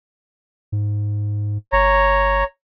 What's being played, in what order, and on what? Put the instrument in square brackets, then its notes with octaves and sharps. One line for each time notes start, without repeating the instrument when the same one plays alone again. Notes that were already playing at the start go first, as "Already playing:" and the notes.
[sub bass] G#2
[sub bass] G1 [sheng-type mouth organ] C#5 A#5